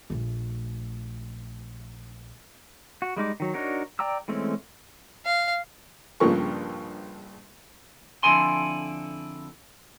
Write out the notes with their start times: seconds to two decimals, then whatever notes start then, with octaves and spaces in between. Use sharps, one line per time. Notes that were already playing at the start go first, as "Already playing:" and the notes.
0.10 A#1 A3
3.02 F#4
3.17 G3 G#3 D#4 D6
3.40 D#3 F#3
3.54 D4 D#4 F#4 A#4 C#5
3.99 D5 G5 A#5 D6 E6
4.28 E3 G#3 A3 C4 C#4
5.26 F5
6.20 A#1 G2 C#3 F3 A#4 C#6
8.23 F2 D3 E4 G#5 C6